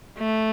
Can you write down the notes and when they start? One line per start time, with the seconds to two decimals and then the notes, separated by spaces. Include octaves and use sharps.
0.18 A3